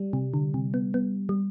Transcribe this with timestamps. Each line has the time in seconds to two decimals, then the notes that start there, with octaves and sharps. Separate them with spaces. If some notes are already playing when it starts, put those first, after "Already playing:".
Already playing: G3
0.13 C3
0.34 D3
0.54 C3
0.74 B3
0.94 B3
1.29 G3